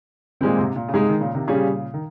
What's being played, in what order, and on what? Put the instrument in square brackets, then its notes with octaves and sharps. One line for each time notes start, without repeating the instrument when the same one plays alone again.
[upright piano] A#2 G#3 C4 [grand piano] D#3 G3
[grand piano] G#2 C3
A#2
C#3
[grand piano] G#2 C3 [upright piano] G#3 D#4 G#4
[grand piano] D#3
A#2 C#3
C3 D#3
[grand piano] A#2 C#3 [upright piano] G3 C#4 G#4
[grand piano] D#3